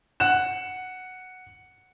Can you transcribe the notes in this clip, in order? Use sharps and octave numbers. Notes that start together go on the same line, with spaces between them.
F#5 F#6 E7